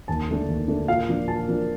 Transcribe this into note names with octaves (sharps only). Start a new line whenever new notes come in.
D#2 A5
D3 A3 D4
D#2
D3 A3 D4
A#2 F5
F3 A#3 D4
A#2 A5
F3 A#3 D4